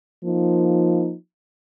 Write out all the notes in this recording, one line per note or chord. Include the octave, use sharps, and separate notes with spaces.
F3 A#3 D#4